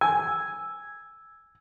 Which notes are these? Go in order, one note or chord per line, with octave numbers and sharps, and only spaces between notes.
G#5 E6 G#6